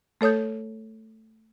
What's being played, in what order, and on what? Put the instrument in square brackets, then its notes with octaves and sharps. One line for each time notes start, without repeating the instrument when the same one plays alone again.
[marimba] A3 A4 C#5 D#6 G6